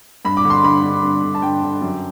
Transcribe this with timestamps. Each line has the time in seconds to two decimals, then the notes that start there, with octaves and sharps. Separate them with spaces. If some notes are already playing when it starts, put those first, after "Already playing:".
0.25 G2 B5
0.37 D6
0.45 D3
0.50 C6
0.64 G2 B5
0.84 D3
1.03 G2
1.24 D3
1.35 A5
1.42 G2 G5
1.63 D3
1.82 F#2